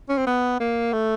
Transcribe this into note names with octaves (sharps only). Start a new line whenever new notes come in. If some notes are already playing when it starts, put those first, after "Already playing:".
C#4
C4
B3
A#3
A3